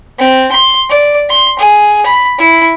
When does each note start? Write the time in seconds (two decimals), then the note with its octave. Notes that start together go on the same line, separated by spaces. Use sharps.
0.20 C4
0.52 C6
0.90 D5
1.30 C6
1.59 G#4
2.06 B5
2.39 E4